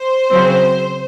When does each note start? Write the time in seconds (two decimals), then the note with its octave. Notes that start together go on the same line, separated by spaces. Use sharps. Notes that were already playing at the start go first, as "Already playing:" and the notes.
Already playing: C5
0.30 C#3 F#3 C4